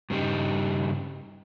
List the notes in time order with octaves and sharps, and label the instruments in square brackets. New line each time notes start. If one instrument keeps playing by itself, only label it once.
[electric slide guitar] G2 C#3 G3 D#4